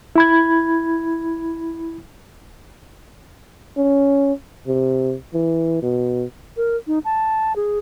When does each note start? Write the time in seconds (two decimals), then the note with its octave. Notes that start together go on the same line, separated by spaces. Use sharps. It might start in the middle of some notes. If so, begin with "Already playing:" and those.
0.16 E4 B5 G#6
3.77 C#4
4.67 C3
5.34 E3
5.82 B2
6.57 A#4
6.87 D#4
7.05 A5
7.56 G#4